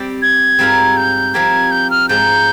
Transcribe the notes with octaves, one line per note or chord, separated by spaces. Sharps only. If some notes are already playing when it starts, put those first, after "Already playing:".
Already playing: G3 C4 G4 D5
G#6
G#2 G3 C4 F4 A#4
G6
F3 C4 G4 A#4 G#6
G6
F6
G#2 F3 G#3 D#4 G#4 G6